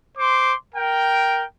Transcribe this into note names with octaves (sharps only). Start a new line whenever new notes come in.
C5 C6 D6
A#4 G5